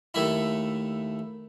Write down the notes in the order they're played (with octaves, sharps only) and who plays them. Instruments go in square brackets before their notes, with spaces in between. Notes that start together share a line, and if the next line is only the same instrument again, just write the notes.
[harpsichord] D#2 A3 E4